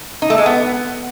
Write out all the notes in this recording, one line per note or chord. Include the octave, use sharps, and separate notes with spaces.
D#4
A3
G#3
B3